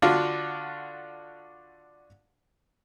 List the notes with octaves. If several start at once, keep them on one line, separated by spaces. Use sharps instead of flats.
D3 D4 F4 F#4